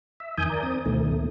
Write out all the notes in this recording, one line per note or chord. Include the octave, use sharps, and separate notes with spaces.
E5
F2 D#3 G#5 D#6 G6
A#4 D5
C4 D#6
D2 B2 D#3 A3
A#2 A3